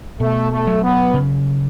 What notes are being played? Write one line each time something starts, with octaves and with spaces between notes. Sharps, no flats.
B2 A3
A3
F#3
B3
C#3